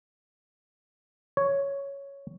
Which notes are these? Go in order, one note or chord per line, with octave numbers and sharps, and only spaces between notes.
C#5